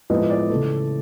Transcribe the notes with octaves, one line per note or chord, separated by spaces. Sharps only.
A2 F3 G#3 B3 D#5
D5
C#3 E3 A3